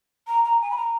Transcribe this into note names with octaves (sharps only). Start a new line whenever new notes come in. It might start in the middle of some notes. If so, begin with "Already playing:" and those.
A#5
A#5
G#5
B5
A#5